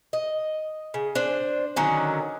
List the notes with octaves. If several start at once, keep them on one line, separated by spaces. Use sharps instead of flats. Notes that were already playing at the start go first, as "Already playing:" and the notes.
D#5
C#3
D4 C5
D3 D#3 F#3 C#4